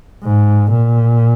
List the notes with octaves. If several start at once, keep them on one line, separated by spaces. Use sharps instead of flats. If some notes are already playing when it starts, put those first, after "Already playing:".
G#2
A#2